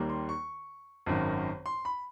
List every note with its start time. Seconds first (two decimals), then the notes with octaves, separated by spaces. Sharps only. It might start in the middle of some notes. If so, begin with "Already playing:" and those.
Already playing: D#2 D#3 G3 A#3
0.10 C6
0.29 C#6
1.06 G#1 F#2 D#3
1.66 C6
1.85 B5